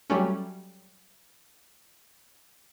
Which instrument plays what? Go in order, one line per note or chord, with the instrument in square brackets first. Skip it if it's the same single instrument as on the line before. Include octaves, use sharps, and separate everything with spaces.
[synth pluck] F#3 G3 A3 C#4